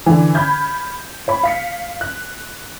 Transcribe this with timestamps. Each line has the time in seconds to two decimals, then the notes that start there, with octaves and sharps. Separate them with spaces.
0.06 D3 E3
0.35 B5 F6 G6 G#6
1.28 C#5 B5
1.43 F5 B6 C#7
2.01 F#6